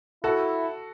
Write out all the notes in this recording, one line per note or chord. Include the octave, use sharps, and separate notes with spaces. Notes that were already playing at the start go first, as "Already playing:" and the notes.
E4 F#4 A4